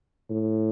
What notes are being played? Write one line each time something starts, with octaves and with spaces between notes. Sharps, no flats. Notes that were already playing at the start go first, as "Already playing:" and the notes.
A2